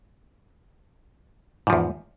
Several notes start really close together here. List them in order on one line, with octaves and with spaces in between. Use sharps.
G#2 F3 E2